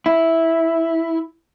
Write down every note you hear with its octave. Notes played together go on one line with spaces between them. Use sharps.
E4